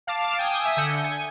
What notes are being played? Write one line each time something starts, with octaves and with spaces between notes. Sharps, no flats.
F5 A5 D6
G5 G#5 D#6
E5 G#5 D#6 E6
D3 G6 C#7
G#5